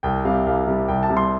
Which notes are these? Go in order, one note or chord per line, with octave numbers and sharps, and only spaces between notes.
C2 G5
C3 G3 F5
C2 F5
C3 G3
C2 G5
A5
C3 G3
C6